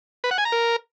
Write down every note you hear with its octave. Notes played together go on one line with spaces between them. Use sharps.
B4
F#5
G#5
A#5
A#4